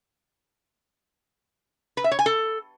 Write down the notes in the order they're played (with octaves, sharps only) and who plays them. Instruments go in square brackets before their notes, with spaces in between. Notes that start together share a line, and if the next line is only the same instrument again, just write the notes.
[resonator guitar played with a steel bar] B4
E5
C#5
G#5
A4